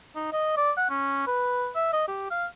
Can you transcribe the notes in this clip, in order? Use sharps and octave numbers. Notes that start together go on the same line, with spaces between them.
D#4
D#5
D5
F#5
C#4
B4
E5
D#5
G4
F5